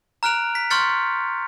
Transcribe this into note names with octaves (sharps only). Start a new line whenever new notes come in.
A#5 F6 F#6 D7 F7
B6
C6 C#6 F6 G6 A6 C#7